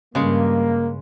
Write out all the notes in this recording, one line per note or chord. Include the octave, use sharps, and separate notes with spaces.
G2 C#3 G3 G#3 A#3